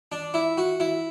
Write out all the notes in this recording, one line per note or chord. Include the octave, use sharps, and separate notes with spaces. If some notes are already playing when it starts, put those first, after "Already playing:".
D4
E4
F#4
E4